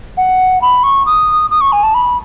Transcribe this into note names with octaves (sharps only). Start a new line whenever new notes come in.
F#5
B5
C#6
D#6
D#6
C#6
G#5
A5
B5